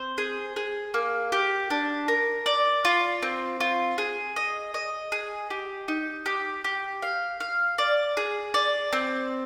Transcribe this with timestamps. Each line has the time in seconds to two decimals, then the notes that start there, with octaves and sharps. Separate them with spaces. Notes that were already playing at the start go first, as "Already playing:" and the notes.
Already playing: C4 C5
0.18 G#4
0.56 G#4
0.94 A#3
1.32 G4
1.70 D4
2.08 A#4
2.46 D5
2.85 F4
3.22 C4
3.60 F4
3.98 G#4
4.36 D#5
4.74 D#5
5.12 G#4
5.50 G4
5.88 D#4
6.26 G4
6.64 G4
7.02 F5
7.40 F5
7.78 D5
8.17 G#4
8.54 D5
8.93 C4